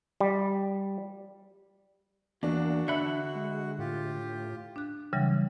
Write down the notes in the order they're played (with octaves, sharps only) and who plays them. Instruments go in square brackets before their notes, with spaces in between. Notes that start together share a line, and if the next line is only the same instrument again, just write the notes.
[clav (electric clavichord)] G3
[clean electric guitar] E2 [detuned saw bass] A#3 [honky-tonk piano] D4 [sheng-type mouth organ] F#4
[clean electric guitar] D3 B5 [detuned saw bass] D4 [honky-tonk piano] E5 F#6 C#7
[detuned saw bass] G#3
[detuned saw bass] A2 [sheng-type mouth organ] F4 G4
[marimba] D4 F#6
C#3 E3 F#3 G3